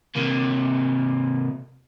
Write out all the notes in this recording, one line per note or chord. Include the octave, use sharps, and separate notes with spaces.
C3 A#3